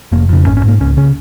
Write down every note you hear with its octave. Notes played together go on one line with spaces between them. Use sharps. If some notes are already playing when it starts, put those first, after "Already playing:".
F1 A#3
F2 C#3
G#1 C#4
C#4
G#2 A#3
C#2 C#4
C#3 C#4